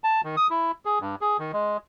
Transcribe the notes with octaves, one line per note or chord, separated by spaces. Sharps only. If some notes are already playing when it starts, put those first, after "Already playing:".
A5
D#3
D#6
E4
G#4
G2
G#4
D#3
G#3